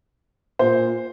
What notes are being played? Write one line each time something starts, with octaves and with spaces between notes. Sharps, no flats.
A#2 C5